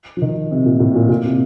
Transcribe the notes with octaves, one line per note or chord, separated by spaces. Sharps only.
F3
D#3
C3
A#2
A2
A#2
A#2
C3